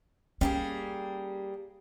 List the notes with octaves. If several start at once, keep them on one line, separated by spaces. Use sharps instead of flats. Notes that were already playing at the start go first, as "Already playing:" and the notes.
G3 A#3 C#4 G#4